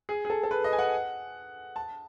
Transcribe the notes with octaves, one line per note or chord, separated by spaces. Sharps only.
G#4
G#4
A4
A4
B4
D#5
G#5
F#5
A5